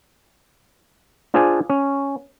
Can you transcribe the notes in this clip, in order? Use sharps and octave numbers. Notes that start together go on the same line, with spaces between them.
D4 F4 G#4 C5 D5 G#5
C#4